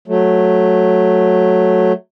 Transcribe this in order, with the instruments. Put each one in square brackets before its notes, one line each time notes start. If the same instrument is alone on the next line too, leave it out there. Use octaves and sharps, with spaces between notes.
[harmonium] F#3 A3